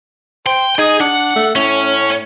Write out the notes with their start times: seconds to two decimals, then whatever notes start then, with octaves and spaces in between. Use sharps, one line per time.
0.46 C5 G5
0.78 D#4 G#4
1.00 D4 F#5
1.36 A3
1.56 A2 C#4